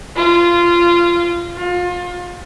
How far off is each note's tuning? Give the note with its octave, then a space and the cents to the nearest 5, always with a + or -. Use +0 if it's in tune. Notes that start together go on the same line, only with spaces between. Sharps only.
F4 -15
F4 +30